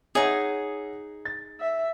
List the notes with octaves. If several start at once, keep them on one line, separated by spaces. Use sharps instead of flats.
D#4 G#4 C#5 E5 F#5
A6
E5